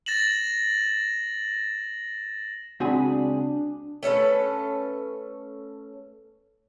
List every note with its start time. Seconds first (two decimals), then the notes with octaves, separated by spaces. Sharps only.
0.06 A6 A#6 E7 F#7
2.80 C#2 C4 D4 F#4 G#4 G#5 B5
4.03 A3 C#4 A4 B4